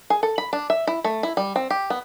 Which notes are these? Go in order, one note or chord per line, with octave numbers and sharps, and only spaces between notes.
G#4
A4
B5
D4
E5
E4
A3
E4
G3
C4
G4
B3